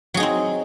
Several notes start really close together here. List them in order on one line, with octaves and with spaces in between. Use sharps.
F#3 G#4 D#4 C4